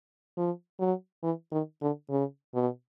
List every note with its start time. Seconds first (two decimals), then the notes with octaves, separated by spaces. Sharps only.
0.37 F3
0.80 F#3
1.23 E3
1.52 D#3
1.81 D3
2.10 C#3
2.54 B2